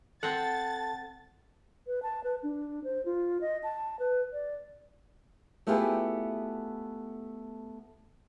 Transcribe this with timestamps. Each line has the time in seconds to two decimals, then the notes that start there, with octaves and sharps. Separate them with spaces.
0.23 C4 A4 F#5 A5 A6
1.87 B4
2.02 A5
2.24 B4
2.43 D4
2.84 C5
3.05 F4
3.41 D#5
3.63 A5
3.99 B4
4.33 D5
5.67 A3 B3 E4 F4 G4 G#4